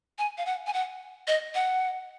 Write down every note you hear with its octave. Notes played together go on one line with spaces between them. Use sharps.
G#5
F5
F#5
G#5
F#5
D#5
F#5